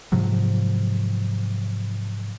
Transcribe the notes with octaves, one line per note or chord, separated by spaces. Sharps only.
G#2 C3 F3 F#3